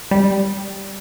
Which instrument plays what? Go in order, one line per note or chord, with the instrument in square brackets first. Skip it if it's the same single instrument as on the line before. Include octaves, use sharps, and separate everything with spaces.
[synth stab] G3